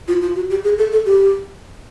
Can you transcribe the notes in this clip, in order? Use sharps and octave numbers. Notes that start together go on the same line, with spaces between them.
F4
F4
F#4
G4
G#4
A4
A4
G4